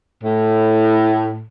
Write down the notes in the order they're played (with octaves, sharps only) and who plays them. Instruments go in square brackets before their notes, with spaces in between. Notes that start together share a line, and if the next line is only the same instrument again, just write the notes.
[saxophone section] A2